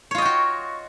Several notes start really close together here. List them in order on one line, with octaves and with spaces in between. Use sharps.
C#5 F4 D#5 G5 F#4